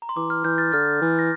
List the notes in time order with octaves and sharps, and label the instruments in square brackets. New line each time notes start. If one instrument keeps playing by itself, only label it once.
[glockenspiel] A#5
C6
[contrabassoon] E3 [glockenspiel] D6
[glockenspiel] F6
[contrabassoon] E3 [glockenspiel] G6
[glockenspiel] F6 A6
[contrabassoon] D3 [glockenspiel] F6 A6
[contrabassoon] E3
[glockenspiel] A#6